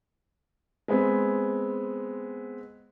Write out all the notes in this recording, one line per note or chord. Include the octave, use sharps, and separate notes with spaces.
G#3 B3 C4